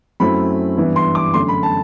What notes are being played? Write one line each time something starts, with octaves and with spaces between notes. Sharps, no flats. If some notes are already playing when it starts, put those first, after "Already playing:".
F#2 F#3 A3 C4 E4 B5
G2 E3 B3 E4
C6
D6
F#2 D3 A3 C6
B5
A5